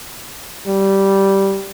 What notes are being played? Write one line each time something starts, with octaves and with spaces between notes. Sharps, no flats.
G3